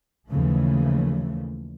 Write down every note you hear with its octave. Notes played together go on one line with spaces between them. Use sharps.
D#2 C#3 E3 F3 A3